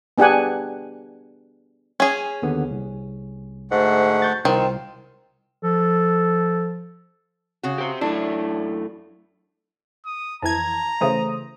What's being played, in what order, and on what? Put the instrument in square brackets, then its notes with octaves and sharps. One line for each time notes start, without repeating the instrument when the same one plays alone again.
[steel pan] B3 D4 G4 G#4 F#5 G#5
[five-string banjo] C#4 G#4
[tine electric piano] D#2 D3 B3
C2
[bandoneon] D2 A3 F#5 [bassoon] G#2
[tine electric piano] C#6 G6 A6
[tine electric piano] C2 [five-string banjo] D#3 [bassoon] C4 [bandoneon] F4
[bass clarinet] F3 [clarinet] A4
[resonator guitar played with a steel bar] C#3 F#4
[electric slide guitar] G4 C5
[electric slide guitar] F#2 A3 E4 [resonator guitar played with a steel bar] D4
[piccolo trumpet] D#6
[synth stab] F2 E3 G#6 [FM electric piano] A5 [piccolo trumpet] A#5
[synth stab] C#3 E3 [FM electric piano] A3 C5 D#6